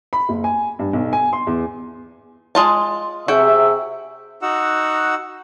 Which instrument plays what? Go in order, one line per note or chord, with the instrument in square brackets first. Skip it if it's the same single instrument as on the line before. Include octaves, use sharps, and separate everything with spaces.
[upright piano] B5
F#1
G#5
G2
B1
G#5
C6
E2
[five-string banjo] G#3 F4 A5
[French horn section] C3 G#4 [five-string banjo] F#4 G5 [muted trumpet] E5
[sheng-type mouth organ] D#4 F#4 F#5 E6